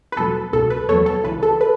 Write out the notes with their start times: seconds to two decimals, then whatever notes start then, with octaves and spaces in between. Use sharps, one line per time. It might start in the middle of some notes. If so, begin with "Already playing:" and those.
0.12 B4
0.16 E2 B2 F#3 A4
0.52 C#2 B2 F#3 A4
0.70 B4
0.89 E2 B2 F#3 A4 C#5
1.06 A4
1.24 C#2 C#3 E3 B4
1.43 A4
1.61 B4